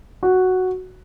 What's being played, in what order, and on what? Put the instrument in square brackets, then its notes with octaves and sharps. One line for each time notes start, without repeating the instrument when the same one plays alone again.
[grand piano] F#4